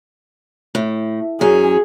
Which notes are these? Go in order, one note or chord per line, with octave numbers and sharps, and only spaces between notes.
A2
F#2 C#4 G#4